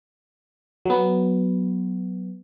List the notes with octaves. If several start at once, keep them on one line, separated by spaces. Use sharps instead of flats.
F#3 B3